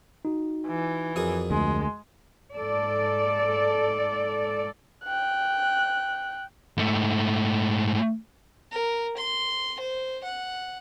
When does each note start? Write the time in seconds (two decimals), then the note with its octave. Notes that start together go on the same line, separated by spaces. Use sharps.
0.25 D#4 F#4
0.67 E3
1.16 F2 F#4 G#4 A#4 D#6
1.51 D2 G#3
2.54 G#2 A4 D5
5.05 G5 F#6
6.78 G#2 A3
8.71 A#4
9.17 C6
9.80 C5
10.24 F#5